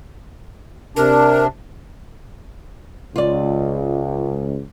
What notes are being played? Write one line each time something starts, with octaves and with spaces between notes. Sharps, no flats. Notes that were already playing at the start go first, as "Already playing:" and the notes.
C3 D4 A#4
C#2 F4 D5